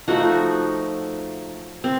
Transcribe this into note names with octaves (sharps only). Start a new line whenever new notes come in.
F3 A3 D#4 F#4 F#5
C4